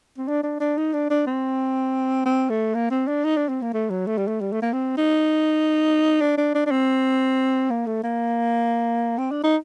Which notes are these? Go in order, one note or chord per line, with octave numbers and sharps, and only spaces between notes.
C4
D4
D4
D4
D#4
D4
D4
C4
C4
A3
A#3
C4
D4
D#4
D4
C4
A#3
A3
F#3
A3
G3
A3
G3
A3
A#3
C4
D#4
D4
D4
D4
D4
C4
A#3
A3
A#3
C4
D4
D#4